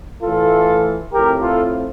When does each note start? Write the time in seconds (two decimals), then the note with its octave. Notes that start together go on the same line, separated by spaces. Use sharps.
0.22 A2 E3 A3 F4 A4
1.12 A2 F3 C4 G4 A#4
1.42 F4 A4